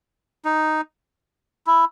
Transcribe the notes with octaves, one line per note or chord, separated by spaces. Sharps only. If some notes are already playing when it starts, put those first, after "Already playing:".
D#4
E4